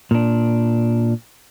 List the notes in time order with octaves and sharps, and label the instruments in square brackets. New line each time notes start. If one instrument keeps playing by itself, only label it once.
[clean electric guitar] A#2 D4